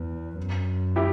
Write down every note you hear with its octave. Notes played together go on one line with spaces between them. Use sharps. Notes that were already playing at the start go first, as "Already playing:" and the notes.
Already playing: E2
F#2
E4 G4